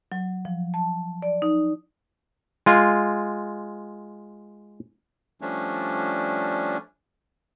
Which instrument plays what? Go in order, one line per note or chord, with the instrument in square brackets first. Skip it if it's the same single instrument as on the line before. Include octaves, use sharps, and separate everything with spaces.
[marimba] F#3
F3
A5
D5
D#4
[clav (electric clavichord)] G#3 F4
[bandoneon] F3 G3 A3 C#4 D4